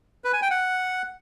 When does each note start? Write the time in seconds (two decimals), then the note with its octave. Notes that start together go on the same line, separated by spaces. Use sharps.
0.24 B4
0.33 G#5
0.42 G5
0.51 F#5